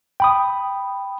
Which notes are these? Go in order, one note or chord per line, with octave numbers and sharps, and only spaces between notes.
G5 B5 D#6